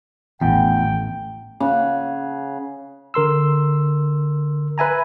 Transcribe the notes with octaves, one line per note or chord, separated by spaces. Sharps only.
A1 E2 G5
C#3 F#5
D3 A#4 C6 E6
B4 E5 G#5 A#5